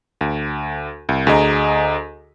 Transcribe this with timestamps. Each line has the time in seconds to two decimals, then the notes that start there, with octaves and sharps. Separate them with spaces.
0.21 D2
1.09 C2
1.27 D2 G#4 D#5 A#5